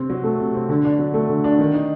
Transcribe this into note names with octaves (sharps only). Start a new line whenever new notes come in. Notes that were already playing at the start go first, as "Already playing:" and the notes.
Already playing: C3 C4
F#3
A3
C3
C4
D3
D4
F#3
A3
D3
D4
D#3
D#4